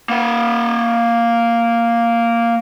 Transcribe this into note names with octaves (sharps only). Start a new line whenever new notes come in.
A#3 F#5